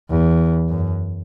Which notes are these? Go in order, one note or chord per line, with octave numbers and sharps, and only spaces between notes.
E2
F#2